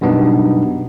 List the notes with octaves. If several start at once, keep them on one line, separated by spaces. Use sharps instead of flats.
F#2 B2 G3 B3 D4 D#4